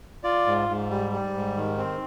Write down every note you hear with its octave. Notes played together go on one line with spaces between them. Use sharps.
F4 D5
G#2
G#2
G3
G3
G#2
D#3
C4